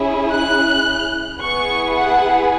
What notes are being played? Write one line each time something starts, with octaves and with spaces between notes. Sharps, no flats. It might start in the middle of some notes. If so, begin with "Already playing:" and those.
Already playing: C#4 E4 G#4
F#6
B3 E4 G#4 C#6
F#5